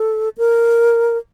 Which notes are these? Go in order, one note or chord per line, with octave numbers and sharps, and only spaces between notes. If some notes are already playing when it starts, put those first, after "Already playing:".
Already playing: A4
A#4